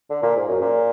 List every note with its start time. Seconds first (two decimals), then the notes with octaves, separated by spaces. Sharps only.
0.10 D3
0.23 A#2
0.36 G#2
0.48 F#2
0.61 A#2